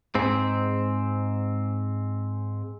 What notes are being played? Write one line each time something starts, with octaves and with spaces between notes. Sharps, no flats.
G#2 C4